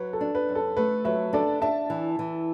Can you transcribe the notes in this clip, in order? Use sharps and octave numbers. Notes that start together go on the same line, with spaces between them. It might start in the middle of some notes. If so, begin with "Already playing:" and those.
Already playing: F#3 B4
A4
D4
B4
F#2
A4
A3 B4
F#3 B4 E5
D4 A4 D5
D4 E5 A5
E3
E3